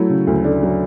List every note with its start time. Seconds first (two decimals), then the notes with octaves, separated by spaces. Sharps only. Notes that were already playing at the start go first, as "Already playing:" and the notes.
Already playing: F#3 A3 E4
0.09 C#3
0.27 D2
0.44 A3 D4
0.63 F#3